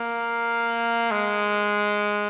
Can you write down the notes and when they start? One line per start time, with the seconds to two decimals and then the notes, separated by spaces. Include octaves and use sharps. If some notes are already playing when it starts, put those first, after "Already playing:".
Already playing: A#3
1.11 G#3